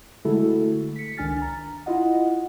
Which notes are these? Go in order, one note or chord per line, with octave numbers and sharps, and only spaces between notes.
D3 G#3 A3 E4 F#4 A4
B6 C#7
C#2 D#3 D4 G#5 F6 A6
A#5
E4 F4 D#5 F#5